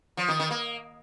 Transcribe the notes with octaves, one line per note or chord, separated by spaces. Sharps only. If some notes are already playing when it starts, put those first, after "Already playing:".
F3
D#3
D#3
A#3